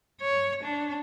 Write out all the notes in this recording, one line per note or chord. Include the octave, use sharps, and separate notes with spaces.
C#5
D4